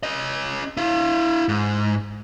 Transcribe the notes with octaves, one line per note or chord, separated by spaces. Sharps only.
C#4 D#5
E4 F5
G#2